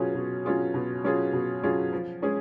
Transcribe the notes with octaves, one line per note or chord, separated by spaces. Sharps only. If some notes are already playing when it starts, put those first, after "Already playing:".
Already playing: B2 F#3 C#4 F4 G#4
B2
F#3 C#4 F4 G#4
B2
F#3 C#4 F4 G#4
B2
F#3 C#4 F4 G#4
F3
G#3 C#4 G#4